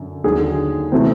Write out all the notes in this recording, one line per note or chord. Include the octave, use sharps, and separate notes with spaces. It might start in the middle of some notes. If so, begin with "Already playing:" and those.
Already playing: F#2 D3
D#2 D3 F#3 G#4
C3 E3 A3 C4